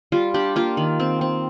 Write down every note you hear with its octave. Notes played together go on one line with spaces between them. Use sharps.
G3 F4
D4 G4
A#3 F4
D#3
C4
C4